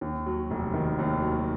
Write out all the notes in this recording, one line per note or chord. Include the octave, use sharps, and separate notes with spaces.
D#2
F#3
F1
D#3
D#2
F#3